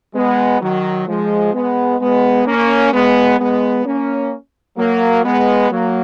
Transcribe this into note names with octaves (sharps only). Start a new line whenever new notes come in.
G#3 B3
D#3 F#3
F3 G#3
G#3 B3
G#3 B3
A#3 C#4
G#3 B3
G#3 B3
A#3 C#4
F#3 A#3
G#3 B3
F#3 A#3